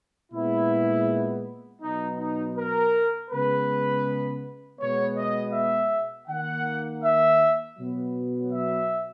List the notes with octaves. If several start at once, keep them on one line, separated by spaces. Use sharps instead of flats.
A#2 G#3 B3 E4
B2 F#3 B3 D#4
D#4
A#4
C#3 G#3 B3 B4
B2 G#3 B3 C#5
D#5
E5
D#3 A#3 F#5
E5
B2 F#3 B3
E5